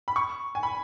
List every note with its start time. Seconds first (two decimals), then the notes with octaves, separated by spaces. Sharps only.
0.08 B5
0.16 C#6
0.55 G#5
0.63 B5